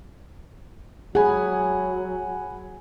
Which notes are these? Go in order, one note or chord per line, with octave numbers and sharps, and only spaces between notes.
F#3 G#4 F#5 G#5 B5